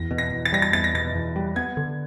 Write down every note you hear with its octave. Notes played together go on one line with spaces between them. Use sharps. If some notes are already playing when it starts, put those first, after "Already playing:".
Already playing: E2 A#6
B2
A#6
E2
A6
G3 A#6
A6
E2 A6
A#6
B2 A6
E2
G3
B3 G#6
D3